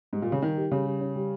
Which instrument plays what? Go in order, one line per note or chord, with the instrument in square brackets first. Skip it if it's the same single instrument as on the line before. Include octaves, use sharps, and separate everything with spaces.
[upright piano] G#2 [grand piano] G3
[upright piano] A#2
[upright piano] C#3 [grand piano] G4
[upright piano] D#3 [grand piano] G3
[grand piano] G4
[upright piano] C#3 [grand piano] G3
[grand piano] G3
C#4
G3